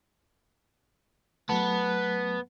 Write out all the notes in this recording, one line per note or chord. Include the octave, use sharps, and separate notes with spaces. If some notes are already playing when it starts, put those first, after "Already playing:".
F#3 A3 B3 A5